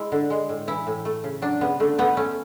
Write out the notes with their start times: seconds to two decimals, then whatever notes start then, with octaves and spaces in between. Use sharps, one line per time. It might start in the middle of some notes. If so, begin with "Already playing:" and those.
Already playing: G#3 E4
0.12 D3
0.30 G#3
0.49 A2
0.67 E3 E4
0.87 A2
1.05 A3
1.24 C#3
1.42 F#3 D4
1.61 C#3 B3
1.80 D3 A3
1.98 A3 B3
2.17 A3 C#4